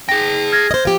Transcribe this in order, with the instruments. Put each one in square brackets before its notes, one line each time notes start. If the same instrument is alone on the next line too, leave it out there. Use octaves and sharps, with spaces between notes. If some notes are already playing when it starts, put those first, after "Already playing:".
[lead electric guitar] G#4 G5 [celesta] A#6
[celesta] F6 G#6 A#6
[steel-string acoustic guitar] C5 D#5
F3 G4